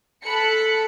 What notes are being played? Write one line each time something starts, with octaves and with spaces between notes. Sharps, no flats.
A4 B5 F#6 C#7